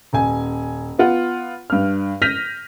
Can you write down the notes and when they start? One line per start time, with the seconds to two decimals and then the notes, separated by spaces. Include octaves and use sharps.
0.13 D#1 G#5
0.99 B3 F4 F#5
1.70 G2 F6
2.22 F6 G6 A#6 B6 D#7 F7